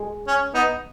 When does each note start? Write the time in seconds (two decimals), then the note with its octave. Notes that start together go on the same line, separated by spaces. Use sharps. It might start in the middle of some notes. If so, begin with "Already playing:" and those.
Already playing: G#3
0.27 C#4
0.54 B3 D#4